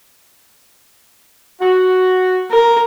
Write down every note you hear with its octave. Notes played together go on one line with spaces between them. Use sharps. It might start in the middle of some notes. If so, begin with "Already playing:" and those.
F#4
A#4